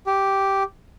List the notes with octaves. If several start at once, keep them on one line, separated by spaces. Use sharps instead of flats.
G4